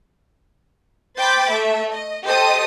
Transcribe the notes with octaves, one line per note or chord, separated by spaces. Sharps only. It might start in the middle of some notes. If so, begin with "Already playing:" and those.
C5 G5 B5 D6 G6 A6
A3 E5
D#5
G4 A4 C5 D#5 A5 D#6